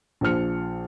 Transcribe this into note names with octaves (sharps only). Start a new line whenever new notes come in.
A#1 F3 C5 F6 C#7